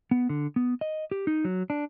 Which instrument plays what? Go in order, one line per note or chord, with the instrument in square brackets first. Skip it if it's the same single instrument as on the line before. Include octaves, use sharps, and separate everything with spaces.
[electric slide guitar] B3
D3
B3
D#5
G4
D#4
F#3
D4